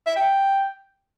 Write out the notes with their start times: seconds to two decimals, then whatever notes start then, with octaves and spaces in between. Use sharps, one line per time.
0.06 E5
0.16 G5